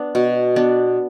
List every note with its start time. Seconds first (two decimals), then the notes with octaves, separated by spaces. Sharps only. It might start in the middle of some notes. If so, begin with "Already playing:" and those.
Already playing: B3 D4
0.15 B2
0.56 B3 D4